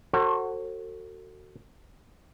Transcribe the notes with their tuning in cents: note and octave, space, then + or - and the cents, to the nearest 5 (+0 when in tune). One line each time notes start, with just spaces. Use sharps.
F#4 +10 A4 +35 C5 +40